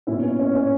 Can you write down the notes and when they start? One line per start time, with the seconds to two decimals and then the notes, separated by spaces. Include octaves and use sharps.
0.07 A#2 F#3 B3 C#4 E4
0.23 C#4
0.39 C#4
0.55 C#4